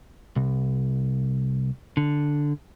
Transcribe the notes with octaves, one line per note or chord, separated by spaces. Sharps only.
C2
D3